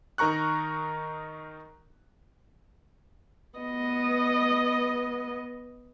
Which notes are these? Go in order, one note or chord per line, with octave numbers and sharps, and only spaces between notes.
D#3 D#4 A#4 A#5 C#6 F#6
B3 D#5